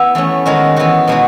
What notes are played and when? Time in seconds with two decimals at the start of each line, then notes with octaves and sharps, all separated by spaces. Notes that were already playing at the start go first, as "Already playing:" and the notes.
Already playing: B3 E4
0.15 E3 A3 C#4
0.46 D#3 G#3 D#4 F#4
0.76 E3 B3 D#4 F#4
1.07 B2 G#3 D#4 F#4